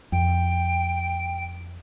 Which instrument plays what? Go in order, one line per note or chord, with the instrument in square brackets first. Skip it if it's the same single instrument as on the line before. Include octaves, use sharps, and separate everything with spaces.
[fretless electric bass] F2 [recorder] G5